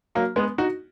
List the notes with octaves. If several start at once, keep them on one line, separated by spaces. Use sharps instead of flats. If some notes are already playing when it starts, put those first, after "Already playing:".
F#3 A#3
G#3 B3
D#4 F#4